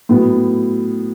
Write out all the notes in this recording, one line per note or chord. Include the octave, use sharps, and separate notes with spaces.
A2 F#3 B3